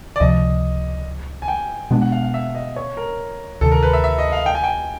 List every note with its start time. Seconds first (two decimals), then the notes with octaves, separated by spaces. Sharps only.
0.16 D5
0.20 C#2 C3 F3 D#5
1.42 G#5
1.48 G5
1.91 B2 G#3 B3 D4 F#5
2.01 F#5
2.12 F5
2.23 F5
2.34 E5
2.55 D#5
2.76 C#5
2.97 A#4
3.61 D2 C3 D#3 A4
3.72 A#4
3.83 B4
3.93 E5
4.04 E5
4.18 D#5
4.32 F5
4.46 G5
4.55 G#5
4.64 G5